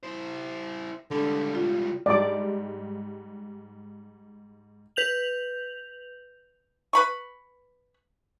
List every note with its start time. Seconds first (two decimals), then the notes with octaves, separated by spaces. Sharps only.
0.03 E4 C5
1.11 C#2 D3 G3
1.55 F4
2.06 G#2 G3 D5 D6
4.96 B4 G6 F7 F#7
6.93 B4 B5 C#6